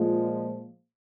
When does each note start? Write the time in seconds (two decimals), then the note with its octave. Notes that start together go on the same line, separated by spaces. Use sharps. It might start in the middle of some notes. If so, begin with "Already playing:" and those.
Already playing: A#2 F3 G#3